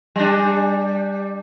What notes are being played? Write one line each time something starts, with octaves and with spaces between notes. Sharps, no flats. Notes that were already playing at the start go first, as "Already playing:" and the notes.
G3 D4